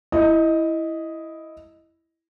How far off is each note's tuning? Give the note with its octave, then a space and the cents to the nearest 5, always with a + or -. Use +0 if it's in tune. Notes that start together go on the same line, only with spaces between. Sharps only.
E4 +0 D#5 +5